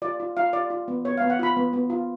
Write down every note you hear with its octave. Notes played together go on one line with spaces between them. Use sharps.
F4 D5
F4
F4 F5
F4 D5
F4
B3
B3 C#5
F5
B3
F#5
F4 B5
B3
B3
F4